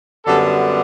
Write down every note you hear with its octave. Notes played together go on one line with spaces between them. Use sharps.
F#2 D3 G3 B3 A4